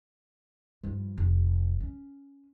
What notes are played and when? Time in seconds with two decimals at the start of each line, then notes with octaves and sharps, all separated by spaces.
0.84 G2 F3
1.18 F1
1.80 C#4